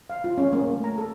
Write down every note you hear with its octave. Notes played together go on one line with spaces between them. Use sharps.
F5
F4
C#4
A#3
A3
A#5
A4